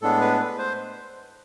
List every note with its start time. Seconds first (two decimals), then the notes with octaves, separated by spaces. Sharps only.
0.02 A2 G#3 B3 D4 A4
0.21 B4
0.40 B4
0.58 C5